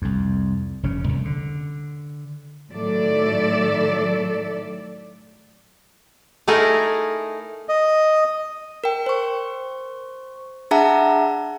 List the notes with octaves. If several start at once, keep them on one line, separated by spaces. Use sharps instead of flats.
C2 F2
F1 G2 C#3 C#4
C2
D3
A2 D#3 F#3 A4 D5 E5
A3 D#4 E4 G#4 A#4
D#5
A#4 G5
C5 C#6
D4 G#4 E5 F#5 A5 A#5